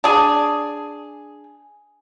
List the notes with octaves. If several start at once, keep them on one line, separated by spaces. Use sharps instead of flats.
D4 G#4